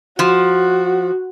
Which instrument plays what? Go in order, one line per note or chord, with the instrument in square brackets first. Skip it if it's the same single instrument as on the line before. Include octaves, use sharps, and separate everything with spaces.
[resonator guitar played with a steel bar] F3 [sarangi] F#4